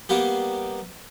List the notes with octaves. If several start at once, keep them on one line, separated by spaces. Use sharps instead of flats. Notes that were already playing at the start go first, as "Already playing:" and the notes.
G3 A#3 B3 G4